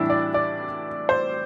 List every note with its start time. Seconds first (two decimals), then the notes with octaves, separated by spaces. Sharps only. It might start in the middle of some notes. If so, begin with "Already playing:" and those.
Already playing: A2 E3 G3 D4 E4
0.10 D5
0.34 D5
1.09 C5